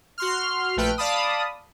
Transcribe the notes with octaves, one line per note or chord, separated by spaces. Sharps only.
F#4 C6 F6
A#1 A3 B4 G5 F6
D5 F5 A5 B5 D#6